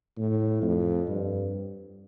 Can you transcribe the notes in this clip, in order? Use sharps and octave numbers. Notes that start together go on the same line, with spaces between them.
A2
F2
G2